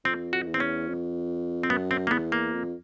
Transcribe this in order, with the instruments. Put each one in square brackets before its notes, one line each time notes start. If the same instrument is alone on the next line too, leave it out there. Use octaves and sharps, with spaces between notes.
[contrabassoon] F2 [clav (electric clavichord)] C4
[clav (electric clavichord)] F#4
[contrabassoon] E2
[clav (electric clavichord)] C4
C#4
[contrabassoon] F2
[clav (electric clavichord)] C4
[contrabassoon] F#2 [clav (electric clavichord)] B3
[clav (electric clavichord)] C4
A#3
[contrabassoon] E2 [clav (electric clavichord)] B3
[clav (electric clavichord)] A#3
[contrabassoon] F2